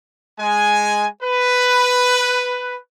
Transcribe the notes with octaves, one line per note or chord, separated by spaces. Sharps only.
G#3 G#5
B4